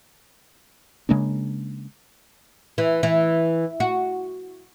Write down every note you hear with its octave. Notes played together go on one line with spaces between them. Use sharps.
C#3 G#3 A#3 D4
E3
E3
F#4